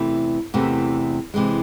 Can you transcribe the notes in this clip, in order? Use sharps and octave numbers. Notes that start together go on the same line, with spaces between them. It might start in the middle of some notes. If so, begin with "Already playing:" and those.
Already playing: E2 C3 E3 A3
E2 C3 E3 A3
C3 E3 G#3